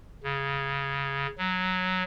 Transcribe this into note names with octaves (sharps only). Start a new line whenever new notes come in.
C#3
F#3